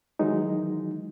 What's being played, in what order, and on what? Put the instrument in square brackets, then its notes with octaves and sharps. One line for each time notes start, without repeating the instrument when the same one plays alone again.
[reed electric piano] D#3 E3 F#3 G#3 D#4